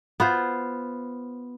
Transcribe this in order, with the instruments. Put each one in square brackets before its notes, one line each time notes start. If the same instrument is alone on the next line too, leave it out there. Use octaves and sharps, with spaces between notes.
[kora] B3 F4 C5